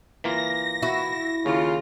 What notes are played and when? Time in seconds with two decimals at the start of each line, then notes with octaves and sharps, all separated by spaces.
0.24 E3 A#3 F4 A#6
0.82 E4 F#4
1.46 D#2 C#3 F4